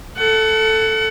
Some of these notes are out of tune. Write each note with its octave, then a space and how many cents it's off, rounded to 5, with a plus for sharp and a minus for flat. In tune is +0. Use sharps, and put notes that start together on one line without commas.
A4 +0 F#5 +25